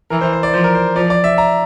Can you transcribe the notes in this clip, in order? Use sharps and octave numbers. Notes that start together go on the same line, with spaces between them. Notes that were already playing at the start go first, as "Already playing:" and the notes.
E3 A#4
C5
C5
D5
F3 C5
A#4
C5
F3 D5
D5
E5
A#5